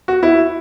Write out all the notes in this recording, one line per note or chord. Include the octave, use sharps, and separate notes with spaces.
F#4
E4